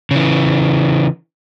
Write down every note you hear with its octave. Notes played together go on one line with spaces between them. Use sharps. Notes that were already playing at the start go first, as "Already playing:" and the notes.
C#3 E3